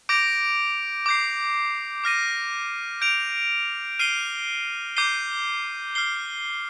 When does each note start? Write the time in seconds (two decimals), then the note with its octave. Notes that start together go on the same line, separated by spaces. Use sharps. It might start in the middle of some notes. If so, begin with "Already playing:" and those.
0.09 D6 G6 A#6 D7 F7
1.06 D6 G6 C7
2.04 D6 F6 A#6 D#7
3.01 G6 D7 F7
3.99 F6 C7 D#7 G7
4.96 D6 G6 C7 D#7 G7
5.95 F6 C7 G7